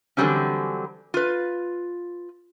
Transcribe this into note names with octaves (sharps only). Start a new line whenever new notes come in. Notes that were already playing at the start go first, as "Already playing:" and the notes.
D3 E3 F#3 G3 C4 C#4
F4 B4